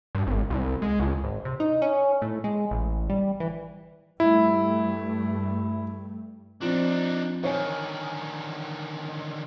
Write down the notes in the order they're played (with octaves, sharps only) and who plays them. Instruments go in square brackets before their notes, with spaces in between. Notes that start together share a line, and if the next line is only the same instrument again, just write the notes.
[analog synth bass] G2
G#1
C2
G#3
C#2
G#1
C3
D#4
C#4
A2
G#3
A1
G3
E3
[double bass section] G2 G3 A3 [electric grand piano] E4
[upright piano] F3 C4 [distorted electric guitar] D4 D#4
[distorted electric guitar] D3 D#3 [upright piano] C#5 G#5